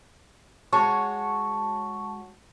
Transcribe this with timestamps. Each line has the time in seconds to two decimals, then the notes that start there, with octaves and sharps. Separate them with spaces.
0.73 G#3 F#4 C#5 A5 C#6